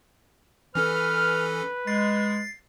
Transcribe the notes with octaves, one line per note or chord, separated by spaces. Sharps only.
E3 C#4 A4 B4 F6
G#3 A6 C7